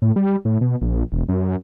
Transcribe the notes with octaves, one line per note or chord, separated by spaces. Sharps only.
A2
G3
A2
B2
A#1
E1
F#2